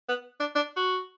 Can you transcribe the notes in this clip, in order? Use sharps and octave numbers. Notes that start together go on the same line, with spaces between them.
B3
D4
D4
F#4